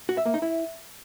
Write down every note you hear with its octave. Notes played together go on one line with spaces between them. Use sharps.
F#4
E5
A#3
D#4
E4